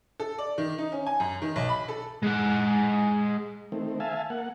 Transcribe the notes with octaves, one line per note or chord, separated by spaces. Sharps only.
A4
D5
D#3
D#4
C#4
G#5
F#2
D#3
B1
B5
A4
G#3 F#5
D#3 A3 C4
E5 F5 G#5 A5
A#3 F#5